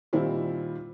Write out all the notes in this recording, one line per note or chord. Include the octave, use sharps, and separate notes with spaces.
A#2 D#3 G3 C4 E4 F4